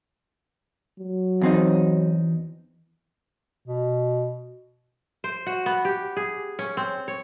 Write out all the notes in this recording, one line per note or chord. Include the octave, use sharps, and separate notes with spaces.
F#3
E2 C4 D#4
B2
C5
F#4
B3
G4
G#4
C#4
C4
C#5